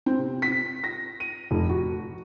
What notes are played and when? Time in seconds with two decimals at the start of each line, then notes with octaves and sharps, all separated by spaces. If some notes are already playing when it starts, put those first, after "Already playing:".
0.06 C4
0.19 C3
0.42 B6
0.84 A#6
1.20 D#7
1.51 F1
1.69 F#4